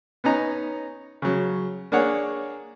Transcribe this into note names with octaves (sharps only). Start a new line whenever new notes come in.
B3 C#4 D#4 A#5
C#3 F#3
A#3 D4 G#4 C#5 F#5